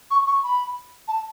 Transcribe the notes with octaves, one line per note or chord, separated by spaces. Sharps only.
C#6
C#6
B5
A5